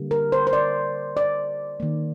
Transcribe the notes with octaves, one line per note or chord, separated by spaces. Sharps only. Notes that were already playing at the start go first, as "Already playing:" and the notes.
Already playing: D3 G3 A#3
A#4
C5
C5
D5
D5
D#3 A#3